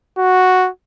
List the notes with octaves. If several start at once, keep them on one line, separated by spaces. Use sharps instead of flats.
F#4